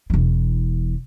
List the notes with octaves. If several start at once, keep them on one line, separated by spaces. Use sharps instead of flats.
E1 E3